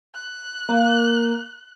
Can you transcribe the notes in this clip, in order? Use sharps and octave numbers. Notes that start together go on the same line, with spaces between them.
F#6
A#3